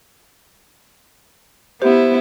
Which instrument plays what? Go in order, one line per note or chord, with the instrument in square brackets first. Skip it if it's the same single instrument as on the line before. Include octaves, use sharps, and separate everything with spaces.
[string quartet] B3 E4 [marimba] G4 [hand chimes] C5